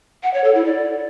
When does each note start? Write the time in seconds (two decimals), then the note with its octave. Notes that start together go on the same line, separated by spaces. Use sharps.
0.23 F#5
0.34 C#5
0.44 A4
0.54 E4
0.65 D5